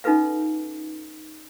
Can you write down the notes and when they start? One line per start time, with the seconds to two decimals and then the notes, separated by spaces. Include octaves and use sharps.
0.04 C#4 D#4 F4 A4 B4 F5